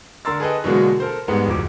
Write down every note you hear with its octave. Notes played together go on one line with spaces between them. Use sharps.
D3 A#4 A#5 C6 E6 A6
G#4 A4 B4 D#5 G5
B2 D3 E3 F#3 G#3 A#3
A4 A#4 C5
G#2 G3 G#3 B3
D1 F2 D6